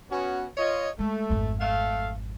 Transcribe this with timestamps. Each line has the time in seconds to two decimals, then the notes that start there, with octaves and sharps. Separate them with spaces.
0.10 B3 C#4 F#4
0.57 F4 C#5 D#5
0.99 G#3 A3
1.30 G#1 F2
1.60 A3 F5